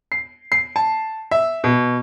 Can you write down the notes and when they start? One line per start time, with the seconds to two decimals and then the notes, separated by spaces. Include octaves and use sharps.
0.12 C7
0.52 C7
0.76 A5
1.31 E5
1.64 B2